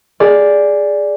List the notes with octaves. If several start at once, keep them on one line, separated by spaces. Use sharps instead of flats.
G#4 D5